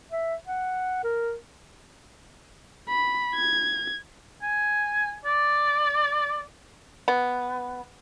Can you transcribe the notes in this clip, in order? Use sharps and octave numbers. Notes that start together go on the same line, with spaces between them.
E5
F#5
A#4
B5
G#6
G#5
D5
B3